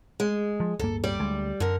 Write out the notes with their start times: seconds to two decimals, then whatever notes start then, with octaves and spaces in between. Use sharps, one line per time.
0.20 G#3
0.60 F3
0.79 D1 G2 A#3 A4
1.04 G3 G4 D5
1.20 D2 G#3
1.60 F#2 D3 A#4